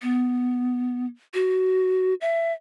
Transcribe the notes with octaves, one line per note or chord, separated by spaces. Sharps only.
B3
F#4
E5